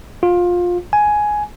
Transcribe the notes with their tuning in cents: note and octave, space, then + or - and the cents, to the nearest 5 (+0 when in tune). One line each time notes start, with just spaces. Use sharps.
F4 +20
G#5 +10